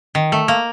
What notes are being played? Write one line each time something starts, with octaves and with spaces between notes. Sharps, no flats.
D#3
A3
A#3